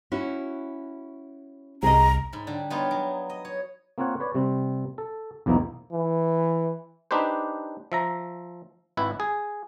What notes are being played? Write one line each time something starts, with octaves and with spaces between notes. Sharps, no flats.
C#4 E4 F#4
C2 G#4 D#5 A#5
G#2 B5
D3 G3
G3 B3 D#4 F4 C#5
F#3
D#5
C#5
A#3 C4 F4 C#5 F#5
B4 C#5 D5
C3 G3 C4
A4
B1 E2 F3 A#3 D#4 E4
E3
D4 D#4 G4 B4 C5
F3 E5 A#5
G#1 E4 B4
G#4